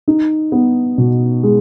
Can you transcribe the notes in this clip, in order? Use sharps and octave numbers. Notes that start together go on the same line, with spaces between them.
D#4
B3
B2
G#3